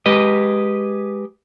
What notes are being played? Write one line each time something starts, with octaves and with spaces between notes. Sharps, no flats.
G#3 G4 B4 D#5